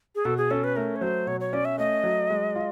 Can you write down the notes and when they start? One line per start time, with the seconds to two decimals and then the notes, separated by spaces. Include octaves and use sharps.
0.15 G#4
0.25 B2 A4
0.37 G#4
0.51 C#4 A4
0.64 B4
0.76 A3 A#4
0.96 C#5
1.01 F#3 C5
1.27 B2 C#5
1.40 C#5
1.53 C#4 D5
1.65 E5
1.78 A3 D#5
2.04 F#3
2.30 G#3
2.55 F4